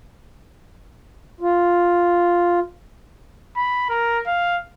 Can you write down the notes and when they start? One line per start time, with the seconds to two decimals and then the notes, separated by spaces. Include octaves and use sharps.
1.41 F4
3.57 B5
3.90 A#4
4.27 F5